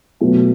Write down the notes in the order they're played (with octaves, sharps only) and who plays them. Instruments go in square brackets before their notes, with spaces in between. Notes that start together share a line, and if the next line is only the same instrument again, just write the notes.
[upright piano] B2 F#3 A3